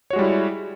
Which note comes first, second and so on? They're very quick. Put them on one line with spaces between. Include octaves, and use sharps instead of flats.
C#5 F#4 G#3 G3 E4